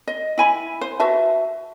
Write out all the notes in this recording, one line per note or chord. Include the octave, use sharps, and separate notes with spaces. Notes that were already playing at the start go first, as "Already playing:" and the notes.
D#5
E4 G#5 B5
C5
F#4 B4 E5 A5